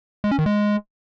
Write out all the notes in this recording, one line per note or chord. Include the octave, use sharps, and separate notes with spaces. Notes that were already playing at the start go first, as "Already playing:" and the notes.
G#3
C#4
D#3
G#3